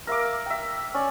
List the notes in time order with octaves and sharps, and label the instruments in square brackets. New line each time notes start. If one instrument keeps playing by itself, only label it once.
[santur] A#4 E5 F5 D6
E5 G5
C#4 D5